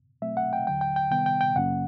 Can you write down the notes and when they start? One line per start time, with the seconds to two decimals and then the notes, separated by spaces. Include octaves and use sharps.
0.22 B2 F#3 A3 C4 E5
0.37 F#5
0.53 G5
0.67 D#2 D3 F#3 G5
0.81 G5
0.96 G5
1.11 C3 D#3 G3 B3 G5
1.26 G5
1.41 G5
1.55 F#2 C#3 F#3 A#3 C#4 F#5